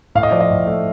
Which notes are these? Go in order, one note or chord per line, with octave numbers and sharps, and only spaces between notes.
A2 F5
D#5
F3 D5
D#5
A2
A3